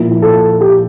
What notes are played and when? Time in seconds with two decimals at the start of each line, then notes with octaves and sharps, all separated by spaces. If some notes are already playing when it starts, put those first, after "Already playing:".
Already playing: A#2 F3 A#3 E4
0.22 A4
0.61 G4